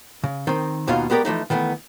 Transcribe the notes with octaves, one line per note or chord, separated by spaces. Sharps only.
C#3
D#3 C4
D#2 B2 D#4 F4 F5
G#3 B3 G4 A#4 D5
E3 F3 A3 D#4
D#3 E3 A3 B3